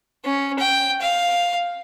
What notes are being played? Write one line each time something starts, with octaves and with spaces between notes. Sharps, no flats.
C#4
G5
F5